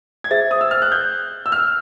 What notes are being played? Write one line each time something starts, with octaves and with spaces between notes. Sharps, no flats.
G#6
G#4 C5 E5 A6
D#6
E6
F6
F#6
G6
E6
F6